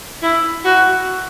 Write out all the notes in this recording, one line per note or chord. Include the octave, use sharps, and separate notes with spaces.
E4
F#4